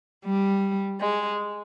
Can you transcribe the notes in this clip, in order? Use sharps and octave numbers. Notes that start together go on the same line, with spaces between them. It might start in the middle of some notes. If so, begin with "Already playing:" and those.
G3
G#3